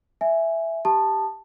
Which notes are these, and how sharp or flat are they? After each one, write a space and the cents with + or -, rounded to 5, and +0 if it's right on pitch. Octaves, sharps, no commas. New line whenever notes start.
E5 +0 G#5 +0
G4 +0 A5 +0 D#6 -25